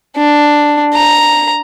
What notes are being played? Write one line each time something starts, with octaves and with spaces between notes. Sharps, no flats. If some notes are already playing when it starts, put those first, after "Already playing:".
D4
A#5